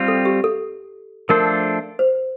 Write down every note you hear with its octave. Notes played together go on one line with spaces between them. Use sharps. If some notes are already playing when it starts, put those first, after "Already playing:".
Already playing: G3 C4 F4
A4
G4
A4
F3 A3 D4 A4 A#4 C5
C5